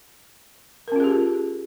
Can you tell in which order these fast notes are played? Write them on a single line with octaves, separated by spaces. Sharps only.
A#4 C#4 F4 G#4 G4